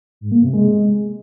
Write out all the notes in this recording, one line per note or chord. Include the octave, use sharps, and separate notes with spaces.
G#2
A#3
C3
G#3